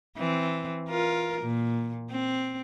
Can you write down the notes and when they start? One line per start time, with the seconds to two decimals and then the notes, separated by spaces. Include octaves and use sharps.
0.17 E3 C4
0.89 F4 A#4
1.41 A#2
2.11 C4